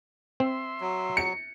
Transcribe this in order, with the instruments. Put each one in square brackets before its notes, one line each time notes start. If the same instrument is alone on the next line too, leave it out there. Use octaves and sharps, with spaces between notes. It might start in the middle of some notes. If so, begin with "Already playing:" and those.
[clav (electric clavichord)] C4 [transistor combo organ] E5 C6
[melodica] F#3
[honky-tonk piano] C#7